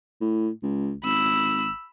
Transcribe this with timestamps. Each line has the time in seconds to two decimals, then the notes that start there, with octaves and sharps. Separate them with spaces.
0.21 A2
0.63 C#2
1.04 G#1 B5 E6